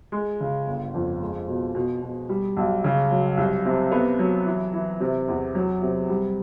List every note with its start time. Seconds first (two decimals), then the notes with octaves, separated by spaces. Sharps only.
0.12 G#3
0.40 C#3
0.67 G1
0.94 F2
1.22 G#3
1.48 B2
1.75 B2
2.02 B2
2.29 G3
2.57 B1
2.84 C#3
3.11 F#3
3.37 C2
3.66 C3
3.92 B3
4.19 F#3
4.46 E3
4.73 E3
5.00 C3
5.28 E2
5.55 F#3
5.82 C3
6.09 G3